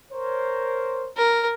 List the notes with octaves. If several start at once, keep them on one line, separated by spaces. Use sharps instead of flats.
A#4 C5 C#5
A#4